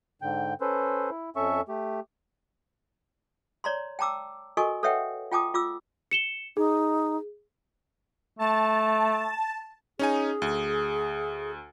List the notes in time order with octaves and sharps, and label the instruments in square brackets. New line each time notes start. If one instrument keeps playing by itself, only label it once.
[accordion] G#2 D3 G5
C#4 A4 B4 C5
E4
F2 C#4 A4 E5 C#6
A3 G4
[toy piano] C#5 D5 A#5 C6
G5 A5 A#5 D6 E6
F#4 A4 A#4 D#5 G#5 C#6
A4 B4 C#5 E5 F#5 G5
F4 G5 A5 D6 D#6
F4 D6 E6
[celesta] C#7 E7 G7
[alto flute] D#4 [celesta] G#4
[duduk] A3 [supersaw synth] A5
[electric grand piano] C#4 D#4 G#5 [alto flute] G#4
[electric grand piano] D2